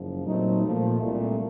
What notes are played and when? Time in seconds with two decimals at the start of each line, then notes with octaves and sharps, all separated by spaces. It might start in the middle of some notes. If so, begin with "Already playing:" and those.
Already playing: F#1 F#2 F3
0.25 A#2 F#3 A3 C4 D#4
0.63 A#2 F3 A3
1.01 C2 A#2 A3